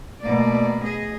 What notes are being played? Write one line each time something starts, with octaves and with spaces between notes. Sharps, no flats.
B2 A3 A#3 D5
G#4 D#5